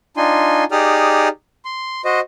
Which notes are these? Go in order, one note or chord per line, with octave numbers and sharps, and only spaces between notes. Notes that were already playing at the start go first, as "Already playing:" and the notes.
D4 D#4 F4 G#5 C6
D#4 G4 G#4 D5 D#6 F6
C6
F#4 C5 D#5